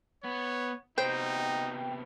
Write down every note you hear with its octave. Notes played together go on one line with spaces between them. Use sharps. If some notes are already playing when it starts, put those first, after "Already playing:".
B3 C#5
C3 B3 D#4 C5 G5